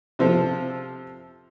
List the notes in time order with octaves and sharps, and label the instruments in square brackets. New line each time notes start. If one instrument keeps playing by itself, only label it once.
[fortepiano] C3 F3 F4 A4